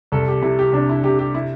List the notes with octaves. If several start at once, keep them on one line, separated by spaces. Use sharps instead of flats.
C2 A4
G4
C3 E4
G4
C3 D4
E4
C3 G4
G4
E4